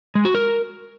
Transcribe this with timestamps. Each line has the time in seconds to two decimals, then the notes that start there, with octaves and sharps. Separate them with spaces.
0.15 G#3
0.25 F#4
0.35 A#4